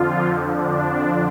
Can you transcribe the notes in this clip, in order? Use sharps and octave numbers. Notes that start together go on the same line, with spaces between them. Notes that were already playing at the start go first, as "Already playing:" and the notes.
Already playing: F2 D3 F3 F4
D4